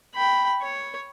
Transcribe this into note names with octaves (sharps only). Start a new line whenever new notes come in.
G5 B5
C#5